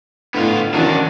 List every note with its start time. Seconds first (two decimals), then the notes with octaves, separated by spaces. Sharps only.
0.34 A2 D3 B3 F4
0.74 D#3 E3 F#3 C#4 D4